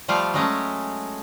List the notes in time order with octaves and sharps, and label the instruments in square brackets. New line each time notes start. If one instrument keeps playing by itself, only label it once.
[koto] F3 G3 A3 F4 F5
F#3 G#3 A3 C#4